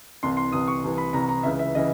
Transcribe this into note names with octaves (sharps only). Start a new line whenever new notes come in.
C2 C3 E3 C6
C6
C2 C3 E3 D#6
C#6
C2 C3 E3
B5
C2 C3 E3 A#5
A#5
C#2 C#3 E3 E5
E5
C#3 E3 D#5